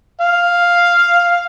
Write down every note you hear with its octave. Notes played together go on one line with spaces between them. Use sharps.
F5